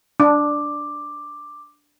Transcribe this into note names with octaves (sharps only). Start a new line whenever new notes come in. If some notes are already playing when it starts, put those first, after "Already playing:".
D4 D6